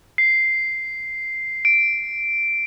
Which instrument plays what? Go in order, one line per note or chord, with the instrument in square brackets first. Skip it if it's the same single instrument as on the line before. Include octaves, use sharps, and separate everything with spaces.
[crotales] C7
D7